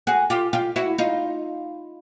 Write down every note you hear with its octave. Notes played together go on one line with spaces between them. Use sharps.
F#4 G#4
F4 G4
F4 G4
E4 F#4
D#4 F4